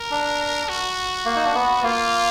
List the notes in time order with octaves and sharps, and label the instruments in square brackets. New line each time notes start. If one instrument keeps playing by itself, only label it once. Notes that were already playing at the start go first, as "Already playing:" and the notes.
Already playing: [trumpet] A#4
[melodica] D4
[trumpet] F#4
[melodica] A#3
D#4
D4
B3
[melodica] A#3 [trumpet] F4